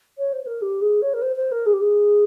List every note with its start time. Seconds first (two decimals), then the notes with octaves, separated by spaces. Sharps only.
0.18 C#5
0.32 C5
0.43 C5
0.46 A#4
0.61 G4
0.81 G#4
1.01 C#5
1.13 A#4
1.21 C5
1.36 C5
1.51 A#4
1.66 G#4
1.73 G4
1.81 G#4